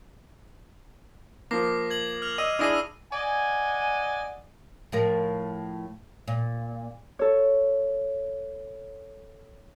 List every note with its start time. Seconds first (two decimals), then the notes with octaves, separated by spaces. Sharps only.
1.51 F3 A#3 D6 A#6 C7
1.90 G#6 F#7
2.22 F6 F7
2.38 D#5 E6 D#7
2.59 D4 E4 G#4 D#6 A#6 D#7
3.13 D5 D#5 F#5 G#5
4.92 A2 F3 A#4
6.28 A#2
7.19 A4 C#5